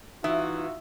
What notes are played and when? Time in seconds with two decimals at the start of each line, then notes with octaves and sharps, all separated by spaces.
0.24 E3 D#4 F4 F#4 E5 D#6